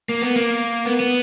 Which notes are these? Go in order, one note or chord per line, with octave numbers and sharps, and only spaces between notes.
A#3
B3
A#3
B3
B3